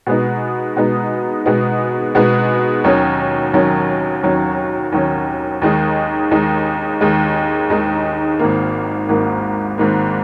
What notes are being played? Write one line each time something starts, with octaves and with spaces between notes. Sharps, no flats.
B2 G#3 B3 D#4
B2 G#3 B3 D#4
B2 G#3 B3 D#4
B2 G#3 B3 D#4
D#2 D#3 F#3 C#4
D#2 D#3 F#3 C#4
D#2 D#3 F#3 C#4
D#2 D#3 F#3 C#4
D#2 D#3 G#3 D#4
D#2 D#3 G#3 D#4
D#2 D#3 G#3 D#4
D#2 D#3 G#3 D#4
G#1 G#2 D#3 A#3
G#1 G#2 D#3 A#3
G#1 G#2 D#3 A#3